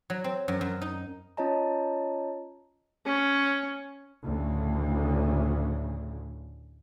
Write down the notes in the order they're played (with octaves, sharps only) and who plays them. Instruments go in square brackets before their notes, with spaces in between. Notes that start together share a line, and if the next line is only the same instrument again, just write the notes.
[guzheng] F#3
C4
F#2
F#2
D#4
[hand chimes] C#4 F4 C#5 D#5 A5 A#5
[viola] C#4
[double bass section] D2 A2 C#3